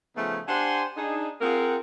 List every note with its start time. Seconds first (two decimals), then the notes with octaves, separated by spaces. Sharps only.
0.16 C#3 F3 A3 B3 C#4 D#4
0.48 D4 G4 C5 F#5 G#5 C6
0.97 D4 D#4 G#4
1.41 C4 F4 G#4 A#4 F#5 G5